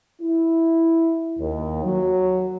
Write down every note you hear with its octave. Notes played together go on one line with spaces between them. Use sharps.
E4
D#2
F#3